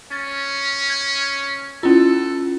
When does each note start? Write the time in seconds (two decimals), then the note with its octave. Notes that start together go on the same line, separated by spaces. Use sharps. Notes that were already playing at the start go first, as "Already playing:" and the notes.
0.12 C#4 A6
0.90 G#6
1.83 C#4 E4 F4 A4